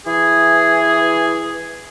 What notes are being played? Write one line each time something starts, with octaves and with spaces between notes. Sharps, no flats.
E3 G#4